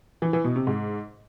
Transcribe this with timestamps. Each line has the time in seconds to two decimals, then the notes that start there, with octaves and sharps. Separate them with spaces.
0.22 E3
0.33 E3
0.44 B2
0.56 C3
0.67 G#2